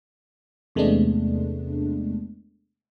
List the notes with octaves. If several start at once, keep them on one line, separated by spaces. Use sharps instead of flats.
E2 C3 G#3 A3 B3 D4